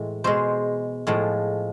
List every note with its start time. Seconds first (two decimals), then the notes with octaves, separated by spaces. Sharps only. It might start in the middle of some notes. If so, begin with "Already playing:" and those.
Already playing: A2 E3 G#3
0.24 B2 G#3 C5
1.07 A2 F3 G#3